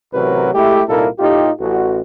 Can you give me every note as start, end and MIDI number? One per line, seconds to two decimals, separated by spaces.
0.13 0.52 33
0.13 0.52 48
0.13 0.52 54
0.13 0.52 66
0.13 0.52 70
0.13 0.52 71
0.53 0.82 56
0.53 0.82 57
0.53 0.82 64
0.53 0.82 67
0.88 1.07 36
0.88 1.07 46
0.88 1.07 58
0.88 1.07 63
0.88 1.07 64
0.88 1.07 69
1.18 1.49 45
1.18 1.49 63
1.18 1.49 65
1.18 1.49 67
1.60 2.02 33
1.60 2.02 66